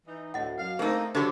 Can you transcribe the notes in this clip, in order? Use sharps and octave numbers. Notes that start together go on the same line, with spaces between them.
E3 D#4
D2 A2 D#5 F#5
F#2 F5
A3 A#3 C4 D#4 G#4 A#4
D3 F#3 F#4 G4 C5